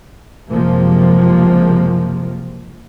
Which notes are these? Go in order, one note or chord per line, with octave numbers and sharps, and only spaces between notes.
F#1 C3 F3 G#3 A#3